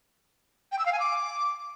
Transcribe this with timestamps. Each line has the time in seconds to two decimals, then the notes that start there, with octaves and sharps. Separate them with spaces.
0.72 G5
0.79 E6
0.86 F5
0.93 G#5
1.00 D6